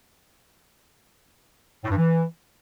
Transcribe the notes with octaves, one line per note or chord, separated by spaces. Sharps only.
A2
G2
E3